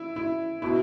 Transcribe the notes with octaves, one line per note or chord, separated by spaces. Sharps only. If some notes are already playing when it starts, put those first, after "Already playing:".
Already playing: E4
E4
B2 E4